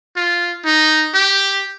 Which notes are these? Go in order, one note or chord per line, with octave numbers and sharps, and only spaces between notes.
F4
D#4
G4